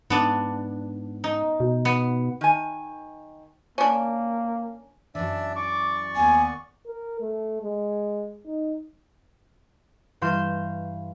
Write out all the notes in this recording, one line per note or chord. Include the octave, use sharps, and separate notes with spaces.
G#2 B3 D4
D#4
B2
B3
D#3 G#5
A#3 C#4 D4
F#2 E3 D4 D5 E5
D5 C#6 D6
D#2 D#3 B3 G#5
A#4
A3
G#3
D#4
G2 E3 F5 C6 G6 E7